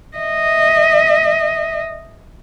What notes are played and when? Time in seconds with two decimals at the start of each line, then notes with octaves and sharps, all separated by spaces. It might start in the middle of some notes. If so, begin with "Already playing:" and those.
0.17 D#5 E5